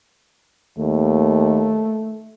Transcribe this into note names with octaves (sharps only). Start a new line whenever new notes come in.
D#2 A3